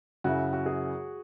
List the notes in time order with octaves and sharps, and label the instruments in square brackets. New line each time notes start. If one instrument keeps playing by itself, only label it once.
[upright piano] F#2 C#3 F#3 E4 [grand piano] F#4
[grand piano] F#4
G#4